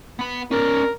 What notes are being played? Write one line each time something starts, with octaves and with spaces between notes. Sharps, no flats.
B3 B5
C#4 A#4 D5